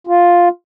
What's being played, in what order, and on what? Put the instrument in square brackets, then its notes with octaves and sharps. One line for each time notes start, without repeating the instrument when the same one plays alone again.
[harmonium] F4